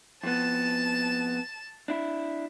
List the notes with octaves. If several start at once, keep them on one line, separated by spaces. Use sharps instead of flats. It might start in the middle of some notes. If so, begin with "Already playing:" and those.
F2 B3 A5 E7
D4 E4